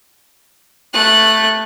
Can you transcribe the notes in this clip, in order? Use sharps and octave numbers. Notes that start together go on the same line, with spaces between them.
A3 F#6